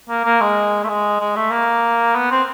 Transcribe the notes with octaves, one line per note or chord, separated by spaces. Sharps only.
A#3
A#3
G#3
A3
G#3
G#3
A3
A#3
B3
C4